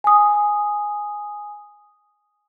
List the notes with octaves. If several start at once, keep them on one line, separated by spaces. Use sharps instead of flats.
G#5 D#6